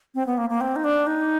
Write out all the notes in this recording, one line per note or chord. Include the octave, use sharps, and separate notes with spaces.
C4
B3
A#3
A#3
C4
D#4
D4
D#4